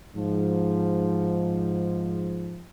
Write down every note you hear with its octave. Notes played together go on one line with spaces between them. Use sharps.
G#2 F3